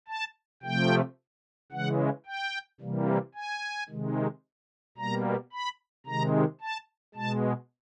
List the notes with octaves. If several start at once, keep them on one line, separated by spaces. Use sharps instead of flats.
A5
C3 F3 A3 G5
C#3 E3 G#3 F#5
G5
C3 E3 G3 A#3
G#5
C3 D#3 G#3
B2 G3 A#3 A#5
B5
C3 D#3 G#3 A#5
A5
B2 G#3 A5